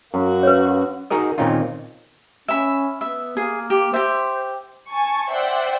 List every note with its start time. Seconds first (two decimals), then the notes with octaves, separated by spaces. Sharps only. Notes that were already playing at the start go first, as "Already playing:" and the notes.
0.14 F#2 A#3 F#4
0.43 B4 C#5
1.10 D#4 F#4 G#4 A#4 D#5
1.38 A#2 D#3 C4 C#4 D#4 F4
2.48 C#4 E5 B5
3.01 B3 E5
3.37 A#3 G#4
3.70 G4
3.94 G4 C5 E5
4.89 G#5 A5 C#6
5.31 C5 D5 E5 F#5 G5